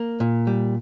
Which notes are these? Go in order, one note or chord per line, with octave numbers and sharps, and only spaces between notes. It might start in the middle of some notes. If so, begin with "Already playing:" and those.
Already playing: A#3
A#2
G3